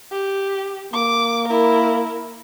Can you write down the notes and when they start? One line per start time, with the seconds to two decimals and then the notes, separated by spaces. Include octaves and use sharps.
0.12 G4
0.93 A#3 D6
1.48 E4 A#4